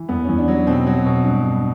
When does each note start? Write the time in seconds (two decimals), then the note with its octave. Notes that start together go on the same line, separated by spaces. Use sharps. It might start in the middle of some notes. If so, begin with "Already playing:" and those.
Already playing: E3
0.09 E2 B3
0.24 E2 C#4
0.38 D4
0.48 F#3
0.67 B2 C4
0.86 F#3
1.06 B2
1.24 G2
1.44 G2